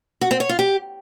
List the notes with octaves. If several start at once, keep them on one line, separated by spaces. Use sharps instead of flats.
F#4
C4
C#5
F4
G4